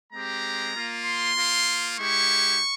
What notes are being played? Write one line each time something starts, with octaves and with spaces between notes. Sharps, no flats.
G#3 C4 G4 A#5
A#3 F4
C6
A#3 F4
G#3 E4 G4 C#6